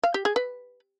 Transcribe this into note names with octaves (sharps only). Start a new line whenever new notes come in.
F5
G4
G#4
B4